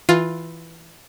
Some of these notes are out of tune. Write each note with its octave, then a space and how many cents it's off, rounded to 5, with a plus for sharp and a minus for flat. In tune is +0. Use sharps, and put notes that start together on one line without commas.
E3 +0 F4 +10 F5 +0